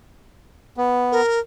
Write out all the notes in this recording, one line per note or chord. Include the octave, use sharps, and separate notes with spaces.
B3
A#4